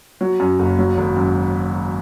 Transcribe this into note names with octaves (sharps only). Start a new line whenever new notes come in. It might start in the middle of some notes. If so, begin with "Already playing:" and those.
F#3
F#2
F#1
F#3
G#1
F#2